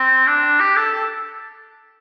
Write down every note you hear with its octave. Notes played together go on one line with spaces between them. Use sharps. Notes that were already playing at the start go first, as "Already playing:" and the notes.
Already playing: C4
D4
G4
A4
A4